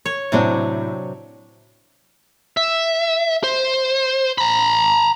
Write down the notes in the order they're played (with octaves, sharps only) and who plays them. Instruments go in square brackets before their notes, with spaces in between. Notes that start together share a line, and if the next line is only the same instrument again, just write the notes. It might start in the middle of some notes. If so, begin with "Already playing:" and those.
[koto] C#5
[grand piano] A2 C4 E4 [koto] C3 F#3 D4
[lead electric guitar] E5
C5
A#5 B5